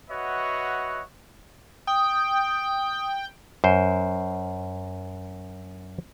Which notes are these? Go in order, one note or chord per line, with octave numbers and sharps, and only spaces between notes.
F#4 B4 C#5 D#5 E5 F#5
G5 D#6
F#2 C5